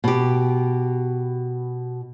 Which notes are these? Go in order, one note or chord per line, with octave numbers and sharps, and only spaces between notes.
B2 G4